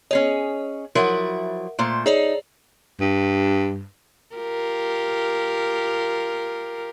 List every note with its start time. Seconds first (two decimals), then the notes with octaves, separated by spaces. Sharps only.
0.11 C#4 G#4 C#5 D#5
0.95 F3 F#3 E4 A#4 E5 F#5
1.79 A#2 A3 C5
2.06 D#4 G#4 C#5 D5
3.00 G2
4.35 F4 G4 A#4